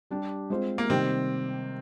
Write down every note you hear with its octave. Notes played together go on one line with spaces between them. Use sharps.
G3 D4 G4
G#3 C4 F4 C5
A#3
C3 D#3 G3 C4